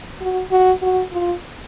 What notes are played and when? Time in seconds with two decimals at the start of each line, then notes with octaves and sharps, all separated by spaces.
0.21 F#4
0.51 F#4
0.82 F#4
1.12 F4